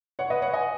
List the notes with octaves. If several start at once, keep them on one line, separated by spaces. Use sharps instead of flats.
C#5 F#5
B4 D#5
C#5 F#5
D#5 G#5